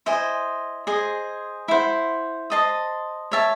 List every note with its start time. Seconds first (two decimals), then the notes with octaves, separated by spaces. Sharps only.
0.06 E4 C5 D#5 G#5
0.87 G#4 C5 D#5
1.68 E4 C5 F#5
2.50 C5 D#5 A5 D#6
3.31 C#5 E5 A5